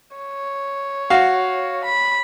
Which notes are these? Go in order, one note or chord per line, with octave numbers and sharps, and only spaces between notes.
C#5
F#4 F5
B5